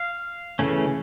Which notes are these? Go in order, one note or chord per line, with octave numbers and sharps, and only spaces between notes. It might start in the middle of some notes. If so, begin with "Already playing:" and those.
Already playing: F5
C#3 E3 A3 C#4